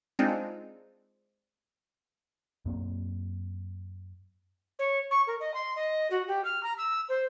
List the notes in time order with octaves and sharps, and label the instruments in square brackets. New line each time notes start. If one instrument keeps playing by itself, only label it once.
[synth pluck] G#3 C4 D4 D#4 F4
[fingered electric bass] F#2 A#3 C4
[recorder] C#5
C#6
A#4
D#5
C6
D#5
F#4
G4
F6
A#5
E6
C5